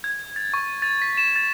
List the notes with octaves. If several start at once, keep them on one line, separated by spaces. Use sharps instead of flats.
G#6
A6
C#6
A6
B6
E7
A6